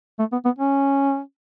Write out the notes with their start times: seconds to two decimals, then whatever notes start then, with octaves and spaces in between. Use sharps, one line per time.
0.19 A3
0.32 B3
0.45 B3
0.58 C#4